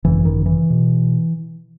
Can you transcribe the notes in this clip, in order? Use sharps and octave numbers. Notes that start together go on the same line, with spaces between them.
G#1 F#2 C#3 E3
D#3
E3
B2